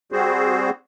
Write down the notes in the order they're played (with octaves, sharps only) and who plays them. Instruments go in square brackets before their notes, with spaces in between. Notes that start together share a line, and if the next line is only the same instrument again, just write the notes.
[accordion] G3 C4 F#4 G#4 C5